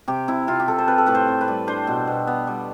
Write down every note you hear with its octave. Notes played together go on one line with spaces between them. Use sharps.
C3 G4
C3 E4
C3 F4
G4
C3 A4
C5
C4 B4
A4
A2 B4
C5
C4
B4
G3
D4 C5
B2
B2
B3
G3